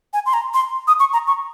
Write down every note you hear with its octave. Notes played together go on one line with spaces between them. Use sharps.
G#5
C6
A#5
C6
D#6
C#6
A#5
C#6